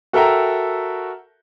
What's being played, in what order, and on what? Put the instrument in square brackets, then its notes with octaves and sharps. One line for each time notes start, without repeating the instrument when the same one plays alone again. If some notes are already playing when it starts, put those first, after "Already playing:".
[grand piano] F#4 A4 A#4 E5 G5 A#5